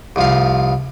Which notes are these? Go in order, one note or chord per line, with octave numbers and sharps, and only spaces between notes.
C2 F3 F5